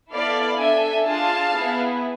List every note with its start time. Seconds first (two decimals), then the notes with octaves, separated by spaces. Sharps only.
0.11 B3 E4 A4 D5 F5
0.59 D4 A4 E5 G#5
1.07 D4 F4 G#4 F5 A5
1.55 B3 E4 G#4